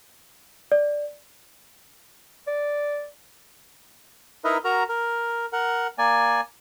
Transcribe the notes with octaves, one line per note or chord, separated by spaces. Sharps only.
D5
D5
D#4 E4 A#4 B4 D#5 E5
F#4 A#4 A#5
A#4
A#4 F#5
A#3 D5 G#5